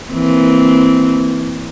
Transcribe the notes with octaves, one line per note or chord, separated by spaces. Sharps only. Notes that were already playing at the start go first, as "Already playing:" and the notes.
E3 A#3 C4